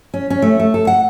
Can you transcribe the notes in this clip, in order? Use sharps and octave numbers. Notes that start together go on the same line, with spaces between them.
C#4
C#4
A3
A3
A4
F#5